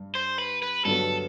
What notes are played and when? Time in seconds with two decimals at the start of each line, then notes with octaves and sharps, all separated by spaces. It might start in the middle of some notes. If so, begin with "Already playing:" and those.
Already playing: G2
0.15 C5
0.38 B4
0.62 B4
0.85 G2 D3 F#3 B3 A4